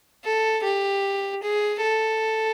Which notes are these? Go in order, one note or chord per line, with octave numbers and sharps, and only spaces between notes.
A4
G4
G#4
A4